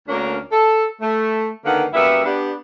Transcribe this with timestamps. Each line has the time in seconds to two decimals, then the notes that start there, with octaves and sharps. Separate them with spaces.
0.08 D2 A#3 C#4 D4 A#4
0.51 A4
1.01 A3
1.65 D3 D#3 A#3 B3 F5 F#5
1.94 F#2 G3 A#3 B3 E5
2.25 B3 D4 G4